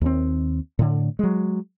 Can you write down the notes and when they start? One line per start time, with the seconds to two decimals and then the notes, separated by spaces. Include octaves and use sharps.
0.01 D#2 C4
0.79 A2 D3
1.19 F#3 G#3